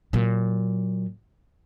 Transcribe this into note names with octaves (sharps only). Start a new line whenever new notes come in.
A#2 F#3